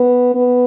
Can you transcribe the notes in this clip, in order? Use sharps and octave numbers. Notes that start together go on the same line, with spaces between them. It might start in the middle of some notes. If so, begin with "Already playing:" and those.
Already playing: B3
B3